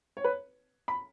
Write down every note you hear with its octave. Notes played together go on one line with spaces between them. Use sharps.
C#5
B4
B5